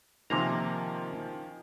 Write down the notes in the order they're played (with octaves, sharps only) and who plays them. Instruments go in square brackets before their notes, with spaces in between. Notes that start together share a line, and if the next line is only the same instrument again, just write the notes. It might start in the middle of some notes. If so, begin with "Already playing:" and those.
[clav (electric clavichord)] C3 A#3 A#5 [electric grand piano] D#3 F3 G#5